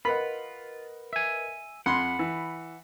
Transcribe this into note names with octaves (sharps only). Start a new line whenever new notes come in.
F4 A#4 B4 D#5 F#5 B5
E5 G#5
F2 F#5 B5 C6
E3